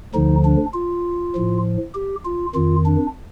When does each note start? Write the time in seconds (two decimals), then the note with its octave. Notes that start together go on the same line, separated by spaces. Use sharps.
0.14 D2 D3 F3 D#4
0.45 D4
0.74 F4
1.35 A2 F3
1.95 G4
2.25 F4
2.55 F2 D#3 F4
2.85 D4